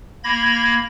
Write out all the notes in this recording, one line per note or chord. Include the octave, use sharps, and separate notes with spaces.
A#3 B5 G#6 A#6